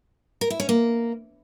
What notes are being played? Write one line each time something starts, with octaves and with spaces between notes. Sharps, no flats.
A#4
E4
C#4
A#3